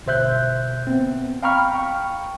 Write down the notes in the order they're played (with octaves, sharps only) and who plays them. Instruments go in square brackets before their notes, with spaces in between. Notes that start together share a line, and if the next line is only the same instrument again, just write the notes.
[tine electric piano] G1 B2 C5 E5 F#6 G6
B3 C4
F5 G5 A#5 B5 C#6 F6
G5 C#6